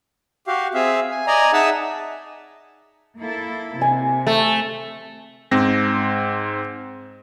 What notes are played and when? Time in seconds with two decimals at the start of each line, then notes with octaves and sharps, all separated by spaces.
0.47 F#4 G4 F5
0.74 C4 G#4 E5 F5
1.11 G#5
1.27 D5 D#5 G#5 A#5
1.53 D#4 G#4 E5 F#5 A5 E6
3.18 A#3 E4 A4
3.81 C3 G#5
4.27 A3
5.51 G#2 C4 A#6